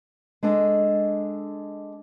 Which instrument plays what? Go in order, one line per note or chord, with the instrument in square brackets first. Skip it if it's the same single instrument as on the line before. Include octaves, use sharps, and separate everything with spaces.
[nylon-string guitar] G#3 D4 A4 D#5